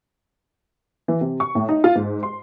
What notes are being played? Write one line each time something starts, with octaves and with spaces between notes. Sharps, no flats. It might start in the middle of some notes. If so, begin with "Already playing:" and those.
E3
C3
C#6
A2
D#4
F4
G#2
C6